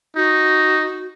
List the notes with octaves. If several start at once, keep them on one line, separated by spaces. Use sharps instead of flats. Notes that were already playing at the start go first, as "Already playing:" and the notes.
D#4 F#4